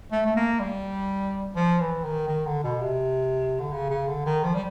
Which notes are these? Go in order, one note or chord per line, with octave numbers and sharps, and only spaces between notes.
A3
A3
A#3
G3
F3
E3
D#3
D#3
D3
B2
C3
D3
C#3
C#3
D3
D#3
F3
G3